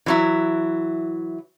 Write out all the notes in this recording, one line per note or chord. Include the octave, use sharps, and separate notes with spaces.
E3 F#3 E4